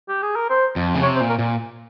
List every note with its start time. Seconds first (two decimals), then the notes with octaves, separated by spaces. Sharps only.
0.09 G4
0.23 G#4
0.36 A#4
0.50 C5
0.76 F2
0.95 C#3
1.03 C3 C#5
1.16 C5
1.21 A#2
1.29 A#4
1.39 A#2